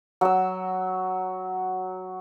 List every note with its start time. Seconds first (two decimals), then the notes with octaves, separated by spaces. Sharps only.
0.21 F#3 E6